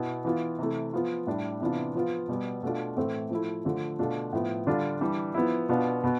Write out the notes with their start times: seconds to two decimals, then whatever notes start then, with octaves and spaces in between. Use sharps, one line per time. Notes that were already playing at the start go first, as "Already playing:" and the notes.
Already playing: B2 B3 E4
0.25 E3 B3 F4
0.59 C3 E3 A3
0.93 F3 B3 F4
1.27 A2 G3 D4
1.61 C3 E3 B3 D4 F4
1.95 F3 B3 F4
2.28 B2 G3 B3
2.63 B2 A3 D4 F4
2.97 A2 E3 A3 C4
3.30 F3 A3 E4
3.65 D3 F3 A3
3.99 B2 A3 D4 F4
4.33 A2 F3 B3
4.67 D3 G3 D4 F4
5.00 E3 G3 D4
5.34 F3 B3 E4
5.69 B2 B3 D4 F4
6.04 B2 B3